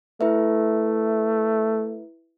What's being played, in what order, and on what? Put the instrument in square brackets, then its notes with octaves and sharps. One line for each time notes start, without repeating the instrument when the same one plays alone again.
[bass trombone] A3 [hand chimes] E4 B4 E5